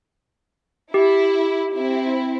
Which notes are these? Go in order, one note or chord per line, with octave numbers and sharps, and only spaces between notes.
E4 G4
C4 E4